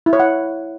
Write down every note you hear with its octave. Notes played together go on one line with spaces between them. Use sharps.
E4
C#5
F#5